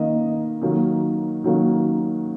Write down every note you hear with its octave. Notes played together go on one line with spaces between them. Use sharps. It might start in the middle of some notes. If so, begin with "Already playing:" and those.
Already playing: D#3 A#3 D#5
D#3 F#3 A#3
D#3 F#3 A#3